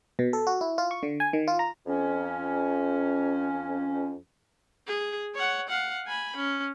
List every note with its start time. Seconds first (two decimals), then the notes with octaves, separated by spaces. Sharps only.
0.19 B2
0.33 A4
0.47 F#4
0.61 E4
0.78 F4
0.91 C#6
1.03 D3
1.20 G#5
1.33 D#3
1.48 F4
1.59 A#5
1.87 F2 C#4
4.87 G#4
5.35 C#5 F#5
5.69 F5 F#5
6.07 G#5 B5
6.37 C#4